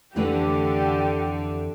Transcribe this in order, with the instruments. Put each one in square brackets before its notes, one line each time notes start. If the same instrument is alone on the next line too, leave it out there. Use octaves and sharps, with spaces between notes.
[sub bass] F2 [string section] D3 [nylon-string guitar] E3 A3 B4 [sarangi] G4